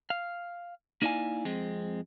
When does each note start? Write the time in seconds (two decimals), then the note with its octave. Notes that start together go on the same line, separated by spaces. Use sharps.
0.10 F5
1.02 A#3 D#4 E4 D5 F5 G#5
1.45 F2 G#3 C4